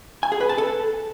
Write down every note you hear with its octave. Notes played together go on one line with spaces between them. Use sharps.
G#5
G#4
B4
A5
A4